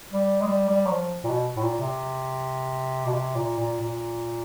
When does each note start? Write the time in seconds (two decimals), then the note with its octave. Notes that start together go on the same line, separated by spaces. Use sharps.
0.13 G3
0.41 G#3
0.47 G3
0.69 G3
0.86 F#3
0.91 F3
1.24 A#2
1.30 B2
1.57 A2
1.63 A#2
1.80 C3
3.06 B2
3.13 C3
3.36 A#2
3.59 A#2
3.81 A#2